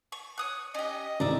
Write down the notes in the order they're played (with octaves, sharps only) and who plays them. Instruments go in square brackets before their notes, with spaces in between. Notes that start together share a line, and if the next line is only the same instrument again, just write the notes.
[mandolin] C#6
C#5 D#6 F#6
[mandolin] C#4 G4 [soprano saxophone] D#5
[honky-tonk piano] G#1 A2 C3 [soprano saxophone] D5 [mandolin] E5 A#5